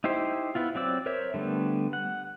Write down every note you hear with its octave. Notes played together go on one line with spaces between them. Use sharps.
D#4 E4 G4 C5
B3 E4 F4
F#3 C4 D5 E6
A#4 C5 C#5 E5
D3 G3 A3 B3
F#5